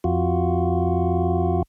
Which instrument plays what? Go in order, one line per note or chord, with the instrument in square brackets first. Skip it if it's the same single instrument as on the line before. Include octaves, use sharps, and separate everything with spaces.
[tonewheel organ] F2 F4 F#4